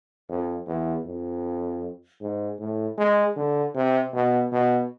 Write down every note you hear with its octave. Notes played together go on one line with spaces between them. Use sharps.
F2
E2
F2
G#2
A2
G#3
D3
C3
B2
B2